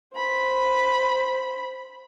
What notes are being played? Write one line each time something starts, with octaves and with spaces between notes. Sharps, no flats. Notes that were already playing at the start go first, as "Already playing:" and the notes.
C5 B5